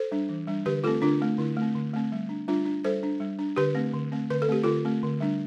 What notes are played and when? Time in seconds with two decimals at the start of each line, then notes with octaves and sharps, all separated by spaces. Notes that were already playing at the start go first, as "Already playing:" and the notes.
Already playing: A4 C5
0.12 G3 D4
0.29 E3
0.47 G3 D4
0.66 D3 G4 B4
0.84 A3 C4 F4 A4
1.02 D3 D4 F4
1.21 A3 C4
1.38 D3 E4
1.57 A3 C4
1.75 D3
1.93 A3 C4
2.12 G3
2.29 D4
2.48 G3 D4 F4
2.65 D4
2.84 G3 A4 C5
3.03 D4
3.20 G3
3.39 D4
3.57 D3 G4 B4
3.75 A3 C4
3.94 D3
4.12 A3 C4
4.30 D3 B4
4.42 A4
4.49 A3 C4 G4
4.64 D3 F4 A4
4.85 A3 C4
5.03 D3
5.21 G3 D4